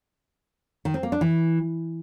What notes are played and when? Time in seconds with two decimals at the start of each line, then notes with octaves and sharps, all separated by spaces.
0.85 D#3
0.94 C4
1.03 A#3
1.12 D4
1.21 E3